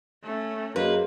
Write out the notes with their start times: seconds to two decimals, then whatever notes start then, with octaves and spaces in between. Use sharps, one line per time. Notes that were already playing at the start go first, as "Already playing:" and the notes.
0.23 A3 C#4
0.76 F#2 A#3 G#4 B4 C5 D#5 F5